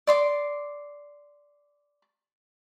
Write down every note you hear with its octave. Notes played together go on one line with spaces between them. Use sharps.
D5 C6 D6